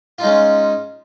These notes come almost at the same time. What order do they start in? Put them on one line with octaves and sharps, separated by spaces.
F4 D#4 G#3 C#4